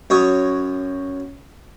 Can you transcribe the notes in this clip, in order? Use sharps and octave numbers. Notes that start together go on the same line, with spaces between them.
F#2 C#5 D#6